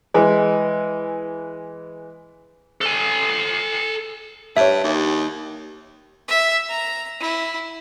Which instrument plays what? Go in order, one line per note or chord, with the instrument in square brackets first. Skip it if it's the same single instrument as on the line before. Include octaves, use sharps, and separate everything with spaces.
[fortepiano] E3 G#3
[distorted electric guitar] A4 G#5
[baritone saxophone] G2 [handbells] C#5 E5
[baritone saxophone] D#2
[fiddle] E5
A#5
E4